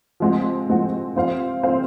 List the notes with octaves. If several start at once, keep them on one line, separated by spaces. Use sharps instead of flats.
F3 G#3 C4 F#4
F3 G#3 C4 F#4
C4 F4 C5 F5
C4 F4 C5 F5